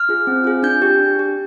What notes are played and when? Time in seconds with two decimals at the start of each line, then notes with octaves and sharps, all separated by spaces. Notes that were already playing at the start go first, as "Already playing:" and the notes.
Already playing: F6
0.09 F4 G#4
0.27 C4
0.44 F4 G#4
0.63 D4 G6
0.82 G4
1.00 D4
1.19 G4